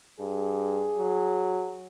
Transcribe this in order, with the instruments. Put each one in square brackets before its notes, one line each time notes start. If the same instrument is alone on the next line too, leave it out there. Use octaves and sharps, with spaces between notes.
[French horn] G2 [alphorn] G#4
[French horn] F#3